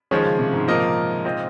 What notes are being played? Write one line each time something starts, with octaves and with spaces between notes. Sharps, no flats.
D#3 F3 G#3 C#4 G#4 C#5
C#3
C3
G#2
A#2 F3 A#3 D#4 A#4 D#5
C4 F4 C5 D#5